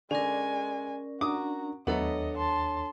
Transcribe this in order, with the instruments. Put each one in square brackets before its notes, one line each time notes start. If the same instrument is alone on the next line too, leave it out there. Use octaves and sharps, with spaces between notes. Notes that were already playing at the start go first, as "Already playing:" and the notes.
[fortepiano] D3 [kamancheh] G#3 G#5 [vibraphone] C#4 A#4 [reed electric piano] D5
[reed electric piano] D4 [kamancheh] F#4 A#5 [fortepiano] D6 D#6
[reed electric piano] D#2 [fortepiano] F#3 A3 B3 [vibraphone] D4 A4 C#5 [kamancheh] D#5
[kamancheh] A5 C6